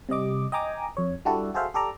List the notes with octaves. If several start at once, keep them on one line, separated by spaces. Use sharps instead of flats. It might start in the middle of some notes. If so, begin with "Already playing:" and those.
C3 G3 D#5 D6
D#5 G5 G#5 A#5 D6 D#6
F2 C#5
G3 D4 E4 F#4 G4 A4
F#4 G#4 A4 C5 E5 F5
G4 A4 D5 A#5